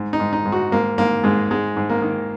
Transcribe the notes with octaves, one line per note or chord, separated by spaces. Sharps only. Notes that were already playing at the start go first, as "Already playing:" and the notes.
Already playing: G#2
D#4
G#2
D#4
G#2
F#4
G#2 A#3
G#2 A#3
G#2 G#3
G#2 G#3
G#2
A#3
D#3